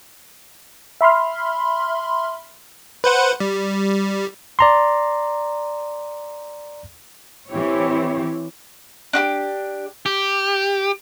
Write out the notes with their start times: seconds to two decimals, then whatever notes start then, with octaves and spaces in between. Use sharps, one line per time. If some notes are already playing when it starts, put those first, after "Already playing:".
1.01 E5 B5 C6 F6
3.04 B4 C5 F#5
3.40 G3
4.59 D5 A#5 C6
7.49 E3 C4 E4 G4 C#5
9.13 D4 F#4 G4
10.06 G4